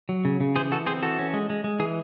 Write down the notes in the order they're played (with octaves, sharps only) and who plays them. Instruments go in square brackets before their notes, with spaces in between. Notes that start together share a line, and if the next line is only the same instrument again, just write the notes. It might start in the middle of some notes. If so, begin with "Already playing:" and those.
[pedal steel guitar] F#3
C#3
C#3
E3 G#4 C5
E3 F#4 A4
C4 G#4 C5
E3 F#4 A4
C#4
G#3
G#3
G#3
E3 G#4